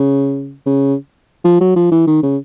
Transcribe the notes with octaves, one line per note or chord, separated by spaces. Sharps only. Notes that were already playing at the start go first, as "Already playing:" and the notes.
Already playing: C#3
C#3
F3
F#3
F3
E3
D#3
C#3